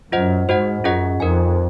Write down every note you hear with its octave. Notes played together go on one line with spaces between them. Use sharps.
F#2 F4 C5 D#5 F#5
G#2 F#4 C5 D#5 F#5
F#2 C#4 F4 G#4 D#5 F#5
F2 D#4 A#4 D#5 G#5